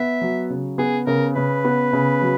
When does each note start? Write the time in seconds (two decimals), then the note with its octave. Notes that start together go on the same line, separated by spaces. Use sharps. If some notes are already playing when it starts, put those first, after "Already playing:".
Already playing: B3 E5
0.21 F#3
0.50 C#3
0.78 B3 G#4
1.07 C#3 A#4
1.35 C#3 B4
1.65 B3
1.93 C#3
2.21 F#3